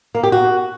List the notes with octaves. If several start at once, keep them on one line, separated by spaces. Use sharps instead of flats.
A#3
G4
F#4